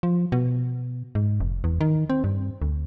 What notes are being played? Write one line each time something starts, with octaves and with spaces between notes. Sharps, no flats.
F3
B2
G#2
F1
E2
D#3
C4
G2
D2